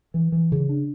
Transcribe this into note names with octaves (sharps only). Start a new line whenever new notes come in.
E3
E3
C#3
D4